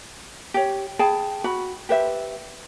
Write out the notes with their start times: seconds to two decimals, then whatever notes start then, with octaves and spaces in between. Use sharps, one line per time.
0.54 G4 C#5
0.99 G#4 G5 A5 B5
1.44 F#4 B5
1.89 G4 B4 C5 E5